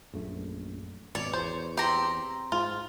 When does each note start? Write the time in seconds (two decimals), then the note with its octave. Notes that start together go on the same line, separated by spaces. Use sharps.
0.14 A#1 F#2 A3
1.15 G#1 B2 C#5 D5
1.33 E2 C5
1.77 C4 G4 A#5 C6
2.52 G#2 F4